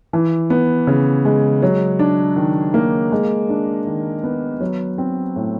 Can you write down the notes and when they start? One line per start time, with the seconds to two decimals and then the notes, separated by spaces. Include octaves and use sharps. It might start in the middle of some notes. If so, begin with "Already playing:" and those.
0.13 E3
0.50 B3
0.87 C#3
1.25 G#3
1.62 F#3
1.99 D4
2.36 D#3
2.74 A#3
3.12 G#3
3.49 D4
3.87 D#3
4.23 B3
4.60 F#3
4.98 C4
5.36 A2